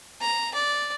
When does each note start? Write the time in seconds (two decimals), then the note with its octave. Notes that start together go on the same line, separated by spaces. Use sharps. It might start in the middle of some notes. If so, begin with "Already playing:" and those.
0.21 A#5
0.54 D5